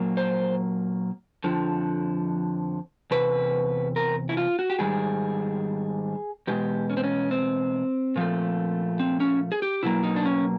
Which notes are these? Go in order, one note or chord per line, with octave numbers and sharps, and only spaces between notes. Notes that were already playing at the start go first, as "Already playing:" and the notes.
Already playing: A#2 F#3 A#3
C5
F2 D3 F3
E2 C3 B4
A#4
E4
F4
F#4
G4
G#2 D#3 G3 G#4
E2 B2 G#3 G4
C#4
C4
C#4
C4
A#2 F3 A3
C4
C#4
G#4
G4
B2 F#3 A#3 E4
D#4
D4
C#4